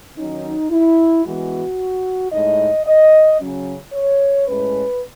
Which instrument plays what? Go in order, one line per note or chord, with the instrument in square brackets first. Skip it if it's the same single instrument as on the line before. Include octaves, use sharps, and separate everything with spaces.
[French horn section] D#3 F#3 C#4 D#4
E4
E3 G#3 B3 F#4
A2 G#3 D#4 D#5
D#5
C#3 F#3 C#4
C#5
A2 G#3 C#4 B4